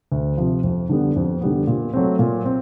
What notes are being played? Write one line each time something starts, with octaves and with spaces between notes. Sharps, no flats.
D2
C3 F3
F2
D3 G3 B3
F2
D3 G3 B3
A#2
F#3 A3 C4
A#2
C4